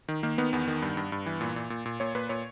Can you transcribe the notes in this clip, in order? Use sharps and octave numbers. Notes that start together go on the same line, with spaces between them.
D#3
D#3 A#3
D#3 B3
E2 B3
D#3
G2
G2
G2
E3
A#2
A#2
A#2
A#2
A#2 C#5
A#2 B4
A#2 C#5